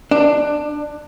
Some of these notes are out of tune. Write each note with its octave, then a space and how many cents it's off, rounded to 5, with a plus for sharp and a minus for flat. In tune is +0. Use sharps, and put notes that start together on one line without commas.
D4 +15